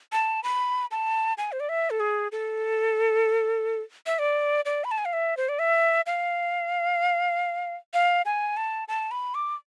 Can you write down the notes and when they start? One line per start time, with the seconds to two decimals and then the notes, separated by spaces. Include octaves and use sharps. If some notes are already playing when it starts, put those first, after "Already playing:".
0.12 A5
0.44 B5
0.91 A5
1.38 G#5
1.52 C5
1.60 D5
1.69 E5
1.90 A4
2.00 G#4
2.32 A4
4.06 E5
4.19 D5
4.65 D5
4.84 B5
4.91 A5
4.98 G#5
5.05 F5
5.13 E5
5.37 C5
5.49 D5
5.59 E5
6.06 F5
7.94 F5
8.26 G#5
8.57 A5
8.88 A5
9.11 B5
9.35 D6